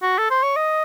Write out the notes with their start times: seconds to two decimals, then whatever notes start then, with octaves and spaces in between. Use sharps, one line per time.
0.02 F#4
0.18 A4
0.30 C5
0.43 C#5
0.56 D#5